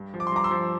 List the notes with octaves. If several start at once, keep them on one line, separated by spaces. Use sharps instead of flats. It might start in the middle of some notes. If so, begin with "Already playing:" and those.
Already playing: G2
F3
D6
C6
G2 A#5 D6
C6 E6
F3